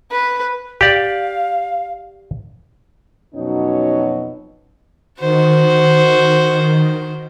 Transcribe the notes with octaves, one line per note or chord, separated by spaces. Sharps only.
B4
G4 D5 F5
F2 B2 F#3 C#4 D#4
D#3 F#4 C5